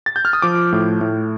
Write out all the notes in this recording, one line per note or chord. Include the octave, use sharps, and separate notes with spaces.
A6
G6
F6
D#6
F3 D6
A2
A2